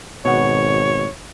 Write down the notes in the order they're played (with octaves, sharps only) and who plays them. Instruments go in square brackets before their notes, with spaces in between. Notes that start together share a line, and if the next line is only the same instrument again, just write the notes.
[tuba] G#1 [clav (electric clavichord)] B2 F#5 [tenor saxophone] C#5